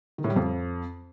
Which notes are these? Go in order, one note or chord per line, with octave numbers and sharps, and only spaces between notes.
D#3
A2
G3
F2